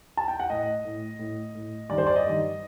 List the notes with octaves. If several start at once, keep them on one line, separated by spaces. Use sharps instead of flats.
A5
G5
F#5
A2 D#5
A2
A2
A2
G2 D#3 D5
C5
D5
D#5
G2 D#3